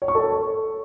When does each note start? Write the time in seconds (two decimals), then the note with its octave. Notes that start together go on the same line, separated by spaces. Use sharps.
0.02 C#5
0.08 C#6
0.15 A4